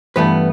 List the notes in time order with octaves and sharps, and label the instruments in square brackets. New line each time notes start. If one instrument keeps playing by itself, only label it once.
[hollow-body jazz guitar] G2 E3 A3 B3 B4